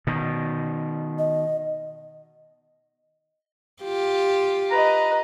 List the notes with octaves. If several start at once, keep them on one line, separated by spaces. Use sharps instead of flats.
B2 D#3
D#5
F4 G4
B4 D#5 A#5